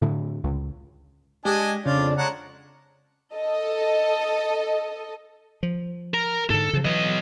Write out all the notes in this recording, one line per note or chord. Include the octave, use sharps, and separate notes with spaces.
A2 D3
C#2
G#3 D4 G4 D#5 G#5
F2 C#3 C#4 D4 F4 D5
G#3 D4 C#5 F#5 A#5
A4 D#5
F3
A#4 A#5
G#2 D3 A4
C#3 F3
E3 F#3 D#5